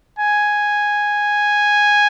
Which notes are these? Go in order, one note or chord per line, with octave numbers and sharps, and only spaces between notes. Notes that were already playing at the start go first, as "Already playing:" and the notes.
G#5